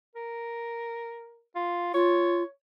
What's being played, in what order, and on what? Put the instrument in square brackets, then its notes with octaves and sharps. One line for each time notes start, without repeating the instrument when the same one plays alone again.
[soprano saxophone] A#4
F4
[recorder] F4 [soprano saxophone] C#5